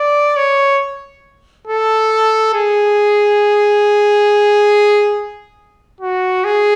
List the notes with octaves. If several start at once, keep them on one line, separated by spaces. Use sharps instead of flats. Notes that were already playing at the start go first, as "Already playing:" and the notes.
Already playing: D5
C#5
A4
G#4
F#4
G#4